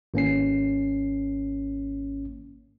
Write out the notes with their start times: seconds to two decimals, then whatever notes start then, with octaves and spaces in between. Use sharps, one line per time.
0.14 G#1 A#3 C#4 C7